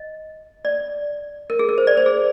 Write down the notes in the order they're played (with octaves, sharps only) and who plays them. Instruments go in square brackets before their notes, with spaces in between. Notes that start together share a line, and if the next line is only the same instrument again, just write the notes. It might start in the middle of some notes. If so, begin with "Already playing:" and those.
Already playing: [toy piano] D#5
D5
A#4
G#4
A#4
C5
D5
C5
G#4